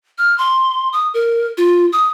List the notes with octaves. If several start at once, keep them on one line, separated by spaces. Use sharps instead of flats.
F6
C6
D#6
A#4
F4
D#6